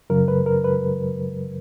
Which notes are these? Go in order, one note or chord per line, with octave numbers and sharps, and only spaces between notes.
F#2 C#3 F#3 A#4
B4
A#4
B4